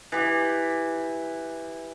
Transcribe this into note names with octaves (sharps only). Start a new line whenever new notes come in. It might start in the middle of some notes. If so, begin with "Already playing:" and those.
E3 G4